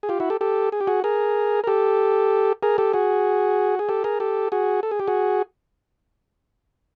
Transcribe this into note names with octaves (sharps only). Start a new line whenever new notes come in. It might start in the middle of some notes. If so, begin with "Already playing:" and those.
G#4
F4 G4
E4 F#4
G4 A4
G4 A4
G#4
G4
F#4 G#4
G#4 A#4
A#4
G4 A4
G#4 A#4
G4 A4
F#4 G#4
G#4
G4 A4
G#4 A#4
G4 A4
F#4 G#4
A4
G#4
G4
F#4 G#4